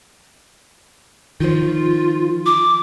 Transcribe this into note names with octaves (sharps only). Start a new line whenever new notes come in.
D#3 F3 F4
D6